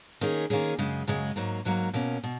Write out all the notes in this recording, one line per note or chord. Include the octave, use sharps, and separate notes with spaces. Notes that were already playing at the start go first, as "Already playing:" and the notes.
D#3 A#3 C#4 G#4
D#3 A#3 C#4 G#4
F#2 C#3 G#3
F#2 C#3 G#3
G#2 F#3 A#3
G#2 F#3 A#3
B2 A#3 C#4
B2